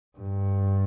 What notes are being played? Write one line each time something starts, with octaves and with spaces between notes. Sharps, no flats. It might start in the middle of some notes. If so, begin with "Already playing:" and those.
G2